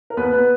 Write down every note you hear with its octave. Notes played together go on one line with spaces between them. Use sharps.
A#4
D#2 B3 B4
B3 B4